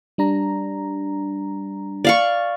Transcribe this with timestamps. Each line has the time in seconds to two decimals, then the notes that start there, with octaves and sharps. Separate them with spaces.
0.18 G3 D4 A#5
2.05 D5 F5 C#6